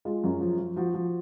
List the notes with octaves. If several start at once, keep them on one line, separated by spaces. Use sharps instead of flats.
G#3 F4
F#2
F3
F3
F3 F#4
F3